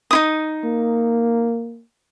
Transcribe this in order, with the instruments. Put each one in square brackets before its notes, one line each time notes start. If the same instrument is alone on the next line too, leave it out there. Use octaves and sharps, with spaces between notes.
[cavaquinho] D#4 E4 D#6
[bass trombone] A#3